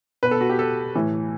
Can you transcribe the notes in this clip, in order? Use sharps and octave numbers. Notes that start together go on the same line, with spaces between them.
B2 B4
A4
F#4
G4
A4
A2 E3